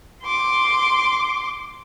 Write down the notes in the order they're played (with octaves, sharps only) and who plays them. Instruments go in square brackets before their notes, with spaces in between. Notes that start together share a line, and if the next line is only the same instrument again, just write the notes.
[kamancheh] C6 D6